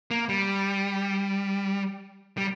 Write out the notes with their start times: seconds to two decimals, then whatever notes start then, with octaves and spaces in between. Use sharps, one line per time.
0.11 A#3
0.29 G3
2.38 G3